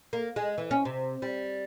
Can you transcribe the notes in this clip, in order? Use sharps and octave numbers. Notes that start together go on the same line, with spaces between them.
A#3
G#3
E3
C#4
C3
G3